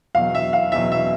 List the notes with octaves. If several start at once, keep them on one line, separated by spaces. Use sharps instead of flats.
E2 B2 F#3 F5
E5
F5
E2 B2 F#3 E5
E5